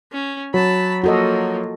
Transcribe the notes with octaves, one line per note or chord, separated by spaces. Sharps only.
C#4
F#3 A5 B5
F3 A#3 F#4 A4 D#5